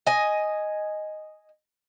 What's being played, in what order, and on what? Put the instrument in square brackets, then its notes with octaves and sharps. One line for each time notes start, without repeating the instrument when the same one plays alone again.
[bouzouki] D#5 G#5